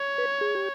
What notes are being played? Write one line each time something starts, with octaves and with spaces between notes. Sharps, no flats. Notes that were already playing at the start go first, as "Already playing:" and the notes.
Already playing: C#5
B4
G#4
G4